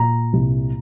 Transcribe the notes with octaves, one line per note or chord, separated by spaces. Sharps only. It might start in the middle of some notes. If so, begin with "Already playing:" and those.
Already playing: A#2 A#5
C2